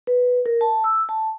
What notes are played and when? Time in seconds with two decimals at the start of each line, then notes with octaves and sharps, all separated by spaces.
0.07 B4
0.46 A#4
0.61 A5
0.84 E6
1.09 A5